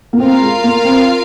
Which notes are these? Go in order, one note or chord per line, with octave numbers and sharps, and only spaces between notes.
A#3
C4 F4 A#4 F5
G#3
A#3
C4